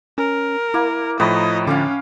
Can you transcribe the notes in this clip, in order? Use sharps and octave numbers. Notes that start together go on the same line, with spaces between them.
C#4 A#4
A#3 E4
A2 F3 D#4 B4 C#5 D#5 B5
D3 C#4 F5 G5 D6